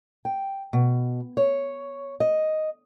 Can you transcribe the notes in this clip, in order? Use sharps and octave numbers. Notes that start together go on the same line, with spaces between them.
G5
B2
C#5
D#5